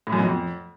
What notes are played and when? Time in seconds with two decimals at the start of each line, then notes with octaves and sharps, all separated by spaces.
0.07 A2
0.12 F#2
0.18 B2
0.24 F2